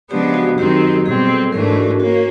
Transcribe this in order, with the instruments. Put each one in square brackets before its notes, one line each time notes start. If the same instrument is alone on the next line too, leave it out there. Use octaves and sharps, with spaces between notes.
[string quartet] C#3 F3 G#3 B3 D4 [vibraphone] G4
[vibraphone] F#4
[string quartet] F#2 D#3 G#3 C4 D#4 [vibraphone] G4
[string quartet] B2 G3 C4 [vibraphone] G#4
[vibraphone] A4
[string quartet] G#2 E3 A3 D4 [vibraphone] A#4
[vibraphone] F#4
F#4
[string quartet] A#3 C#4 [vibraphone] F#4